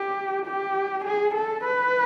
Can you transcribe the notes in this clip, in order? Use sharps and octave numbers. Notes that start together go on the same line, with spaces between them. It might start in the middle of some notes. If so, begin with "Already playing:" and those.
Already playing: G4
G4
G#4
A4
B4